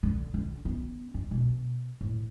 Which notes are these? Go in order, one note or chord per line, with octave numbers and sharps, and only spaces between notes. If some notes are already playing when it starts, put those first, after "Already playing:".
D3
D3
B3
G2
B2
A2